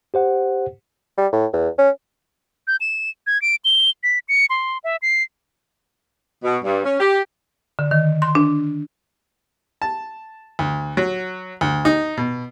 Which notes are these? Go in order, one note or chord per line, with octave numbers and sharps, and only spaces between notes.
G4 C5 F#5
G3
A2
E2
C#4
G6
E7
G#6
D7
G7
B6
C#7
C6
E5
C7
B2
G2
C#4
G4
D3
D#3
C6
D4
A5
D2
F#3
D2
D#4
B2